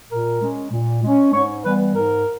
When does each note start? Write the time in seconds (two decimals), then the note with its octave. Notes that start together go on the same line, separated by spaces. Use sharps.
0.10 A#2 A#4
0.41 G#3 C#4
0.71 A#2
1.03 G#3 C#4
1.33 G#2 C#5
1.64 E3 G3 B3 B4
1.95 G#2 A#4